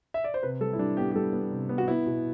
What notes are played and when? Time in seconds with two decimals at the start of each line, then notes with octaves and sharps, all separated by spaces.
0.14 E5
0.24 D5
0.34 C5
0.43 C3 B4
0.60 G3 A4
0.73 E4
0.78 G3 D4
0.97 B3 G4
1.11 G4
1.15 G3 A4
1.33 B3
1.52 C3
1.69 B3
1.78 F#4
1.88 B3 E4
2.06 B2